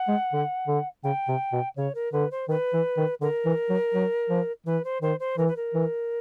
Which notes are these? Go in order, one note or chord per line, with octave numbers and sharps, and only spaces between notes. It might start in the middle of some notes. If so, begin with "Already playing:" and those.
Already playing: F#5
G#3
D3
D3
C#3 G5
C3
B2
C#3 C#5
A#4
D3 B4
C5
D#3 B4
E3
D#3
D3 A#4
E3
F#3
F#3
F3
E3 B4
C5
D#3 C5
C5
E3 A#4
B4
A#4
E3